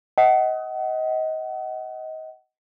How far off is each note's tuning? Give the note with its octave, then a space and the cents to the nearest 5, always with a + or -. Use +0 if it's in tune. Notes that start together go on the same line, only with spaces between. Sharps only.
D#5 +25 F#5 +30